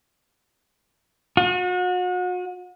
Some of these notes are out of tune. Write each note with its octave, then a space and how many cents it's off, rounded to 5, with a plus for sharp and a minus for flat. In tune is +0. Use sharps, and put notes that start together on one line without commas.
F#4 -40